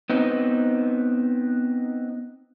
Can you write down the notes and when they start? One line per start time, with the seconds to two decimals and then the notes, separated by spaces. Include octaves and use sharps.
0.10 B3 C4 D#4